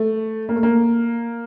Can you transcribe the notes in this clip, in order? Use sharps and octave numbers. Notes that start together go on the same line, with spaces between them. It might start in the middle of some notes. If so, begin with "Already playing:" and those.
Already playing: A3
A#3
A3
A#3